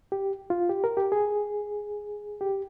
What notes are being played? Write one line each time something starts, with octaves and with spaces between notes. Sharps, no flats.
G4
F4
G4
A#4
G4
G#4
G4